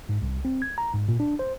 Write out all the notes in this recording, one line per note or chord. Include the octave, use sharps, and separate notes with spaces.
G#2
C2
C4
G#6
A#5
G#2
A#2
D4
C5